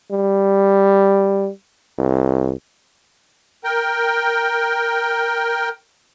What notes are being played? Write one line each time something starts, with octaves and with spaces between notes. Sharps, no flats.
G3
C2
A#4 G5